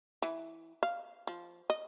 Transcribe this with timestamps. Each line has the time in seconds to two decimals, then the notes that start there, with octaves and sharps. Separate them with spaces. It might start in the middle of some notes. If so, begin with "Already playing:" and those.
0.22 E3
0.83 F5
1.27 F3
1.70 D#5